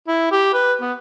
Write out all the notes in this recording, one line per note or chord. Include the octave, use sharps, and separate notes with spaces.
E4
G4
B4
B3